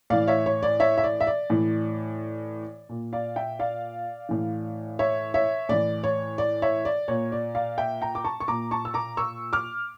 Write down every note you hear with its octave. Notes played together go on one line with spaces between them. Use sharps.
A2 E3 D5 F5
C#5 E5
C#5
D5
C#5 E5
E5
D5
E5
D5
A2 E3
A#2
D5 F5
E5 G5
D5 F5
A2 E3
C#5 E5
C#5 E5
A2 E3 D5
C#5
D5
C#5 E5
D5
A#2 C#5
D5
D5 F5
E5 G5
G5 A#5
D6
A5 C#6
C#6
A#2 A#5 D6
A5 C#6
E6
A#5 D6
C#6 E6
D6 F6